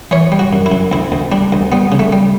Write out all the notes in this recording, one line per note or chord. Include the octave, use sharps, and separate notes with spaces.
E3 C#5
G3
F#4
F#2
E4
F#2
D2 E4
D2
G3 D4
D2
G3 B3
C#3
A3
G3